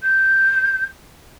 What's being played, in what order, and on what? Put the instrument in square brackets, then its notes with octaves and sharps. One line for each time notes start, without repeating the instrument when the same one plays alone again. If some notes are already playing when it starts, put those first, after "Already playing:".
[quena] G6